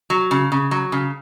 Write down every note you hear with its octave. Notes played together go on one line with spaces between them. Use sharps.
F#3
C#3
C#3
F#3
C#3